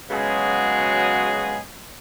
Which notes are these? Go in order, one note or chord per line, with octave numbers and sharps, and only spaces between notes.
C#3 F#3 G#3 B3 F#4 G#4